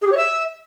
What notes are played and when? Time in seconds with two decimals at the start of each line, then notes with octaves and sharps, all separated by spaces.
0.01 G#4
0.06 G4
0.11 C#5
0.16 E5